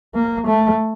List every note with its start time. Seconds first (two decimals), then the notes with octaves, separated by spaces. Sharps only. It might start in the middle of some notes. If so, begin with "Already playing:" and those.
0.15 A#3
0.47 A3